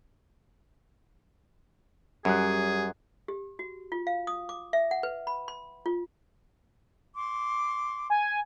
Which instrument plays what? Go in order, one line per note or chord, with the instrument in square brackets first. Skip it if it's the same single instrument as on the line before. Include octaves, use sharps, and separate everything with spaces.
[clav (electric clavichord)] F#2 [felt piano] G3 F#6 [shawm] G#4
[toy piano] G4
F#4
F4
F5
D#6
D6
E5
F#5
B4
B5
C6
F4
[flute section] C6 D6
[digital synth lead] G#5